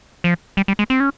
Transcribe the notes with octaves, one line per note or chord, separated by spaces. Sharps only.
F3
G3
G3
G#3
C4
C#4